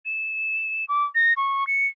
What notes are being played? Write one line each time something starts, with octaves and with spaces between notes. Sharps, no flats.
E7
D6
A#6
C#6
C#7